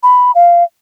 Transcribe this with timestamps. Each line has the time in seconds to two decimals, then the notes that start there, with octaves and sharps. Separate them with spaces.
0.03 B5
0.35 F5